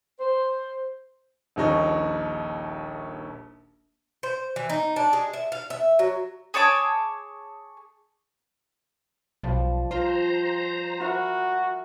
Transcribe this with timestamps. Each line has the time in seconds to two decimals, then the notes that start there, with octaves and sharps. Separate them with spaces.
0.20 C5
1.56 D#1 A#1 D#2 D#4 C#6
4.23 C5
4.56 E3
4.70 D#4
4.96 D4
5.13 G#3
5.33 E5
5.52 F5
5.70 E5
5.99 F#3
6.54 G#4 C#5 A5 D6
9.43 B1 F3 G3 A5
9.91 F4 C5 A#5
11.01 E4 F#4 A#4 F#5